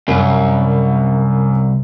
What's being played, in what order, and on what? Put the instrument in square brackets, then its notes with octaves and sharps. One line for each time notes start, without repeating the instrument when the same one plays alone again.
[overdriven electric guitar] C2 [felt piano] F#2